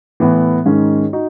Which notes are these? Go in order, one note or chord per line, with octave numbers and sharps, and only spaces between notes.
A2 E3 B3
G#2 D#3 G#3 C#4
D#4 F#4